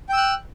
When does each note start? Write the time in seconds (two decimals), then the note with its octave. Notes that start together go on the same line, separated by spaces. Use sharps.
0.09 G5
0.13 E6
0.17 F#6